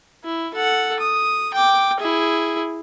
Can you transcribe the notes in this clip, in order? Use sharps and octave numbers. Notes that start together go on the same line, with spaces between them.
E4
A4 F#5
D#6
G5 D6
E4 G#4